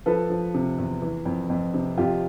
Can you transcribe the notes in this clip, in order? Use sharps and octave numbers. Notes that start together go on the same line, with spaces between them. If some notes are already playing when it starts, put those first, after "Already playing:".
F3 A4 B4
F3
C3
E2
E3
F2
F2
C3
F2 F4 G4